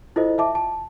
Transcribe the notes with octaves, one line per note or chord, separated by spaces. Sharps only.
E4 F4 A4 C5 D#5
E5 A5 D6
A5